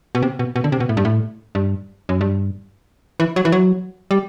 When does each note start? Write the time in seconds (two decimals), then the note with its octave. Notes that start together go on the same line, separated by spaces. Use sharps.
0.15 B2
0.23 C3
0.39 B2
0.56 B2
0.64 D3
0.72 C3
0.80 B2
0.89 A2
0.97 G2
1.05 A2
1.55 G2
2.09 F#2
2.21 G2
3.20 E3
3.36 F#3
3.45 E3
3.52 F#3
4.11 G3